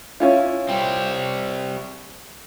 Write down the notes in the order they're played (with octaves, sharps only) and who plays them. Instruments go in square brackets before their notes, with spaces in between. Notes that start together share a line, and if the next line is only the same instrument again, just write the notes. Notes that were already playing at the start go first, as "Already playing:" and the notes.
[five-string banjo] C#4 E4 F4
[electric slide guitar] G3 C4